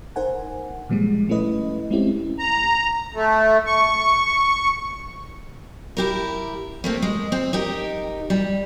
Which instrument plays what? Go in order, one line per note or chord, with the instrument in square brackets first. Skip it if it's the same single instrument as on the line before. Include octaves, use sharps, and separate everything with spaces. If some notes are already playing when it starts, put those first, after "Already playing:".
[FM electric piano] D#4 A#4 C5 F#5 G#5
A#2 F3 G3 G#3
A3 C#4 E4 B4 D#5
G#3 C4 C#4 E4 G4
[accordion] A#5
A3
C#6
[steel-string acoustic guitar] E4 G4 A#4
A3 A#3 C4
G#3
C4
D#4 G4 A#4
G3